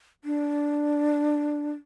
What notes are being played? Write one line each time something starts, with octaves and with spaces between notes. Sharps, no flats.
D4